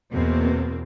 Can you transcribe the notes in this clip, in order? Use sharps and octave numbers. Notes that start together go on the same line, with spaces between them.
E2 B2 A#3 C4